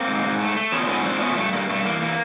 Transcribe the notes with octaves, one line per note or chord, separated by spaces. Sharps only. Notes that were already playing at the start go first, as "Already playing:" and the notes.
Already playing: A#3 C4
G#2
G#2
A3
A3
F3 B3 C#4
D4
G#2 B3 C#4
F3 C4 D4
A3 B3 C#4
G2 A3
G2 A#3
G2 A3
E3 A#3
E3 A#3